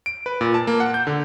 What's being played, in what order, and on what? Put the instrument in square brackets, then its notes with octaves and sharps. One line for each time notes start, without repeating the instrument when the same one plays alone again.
[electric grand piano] D7
B4
A#2
A5
A#3
F#5
G6
D3